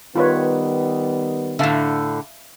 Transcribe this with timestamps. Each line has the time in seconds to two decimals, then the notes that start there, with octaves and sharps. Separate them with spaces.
0.15 D#3 G3 B3 F4 B4 C#5
1.59 A2 D3 E5 F5 A5